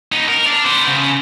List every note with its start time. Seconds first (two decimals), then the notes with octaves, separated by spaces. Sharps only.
0.12 B3 D#4
0.28 A#4
0.46 D4 D5
0.64 B3 C5
0.87 C#3